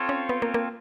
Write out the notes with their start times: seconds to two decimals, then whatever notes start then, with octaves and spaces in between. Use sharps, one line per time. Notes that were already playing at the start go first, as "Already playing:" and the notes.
Already playing: C4 F4 A4 C#5
0.09 C#4
0.29 B3
0.42 A#3
0.54 A#3